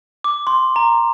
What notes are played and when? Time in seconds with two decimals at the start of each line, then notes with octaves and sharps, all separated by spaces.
0.24 D6
0.47 C6
0.76 A#5